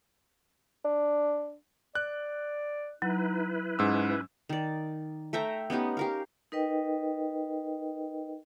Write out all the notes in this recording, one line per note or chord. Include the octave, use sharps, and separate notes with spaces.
D4
D5 F#6
F#3 D#4 E4 B4
G#2 C#4 E6
D#3 D5
A3 E5 G5 A#5
B3 C#4 D#4 G4
G4 A#4 F5
D#4 A#4 B4 D#5 G5